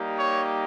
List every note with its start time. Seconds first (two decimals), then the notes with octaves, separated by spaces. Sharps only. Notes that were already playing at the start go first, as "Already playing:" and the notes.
Already playing: G3 A#3 D#4 G4
0.16 C#5